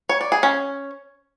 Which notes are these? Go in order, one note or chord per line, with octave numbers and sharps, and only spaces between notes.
C#5
D5
G#4
C#4